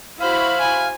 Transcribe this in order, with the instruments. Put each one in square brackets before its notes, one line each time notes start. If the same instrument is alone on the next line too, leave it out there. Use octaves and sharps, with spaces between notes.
[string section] E4 F#4 B5 [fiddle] C5 [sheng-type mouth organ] F5
[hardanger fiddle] G#5